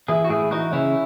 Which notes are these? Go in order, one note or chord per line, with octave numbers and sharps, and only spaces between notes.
E3 E4 G#4
F#4
A2 E4 G#4
E3 D#4 F#4
C#3 C#4 E4